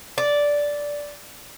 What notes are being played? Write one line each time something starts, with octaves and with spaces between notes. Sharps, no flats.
D5